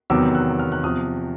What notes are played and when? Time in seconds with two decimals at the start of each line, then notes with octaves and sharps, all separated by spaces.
0.10 E2 C3 D#3 F#3 B3 D6 E6
0.35 E6 F#6
0.59 F6
0.72 F#6
0.83 E2 C3 F3 D#6 F6